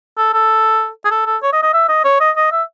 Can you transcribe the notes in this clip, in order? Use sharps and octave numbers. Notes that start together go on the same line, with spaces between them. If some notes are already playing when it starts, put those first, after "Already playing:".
A4
A4
G#4
A4
A4
C#5
D#5
D#5
E5
D#5
C#5
D#5
D#5
E5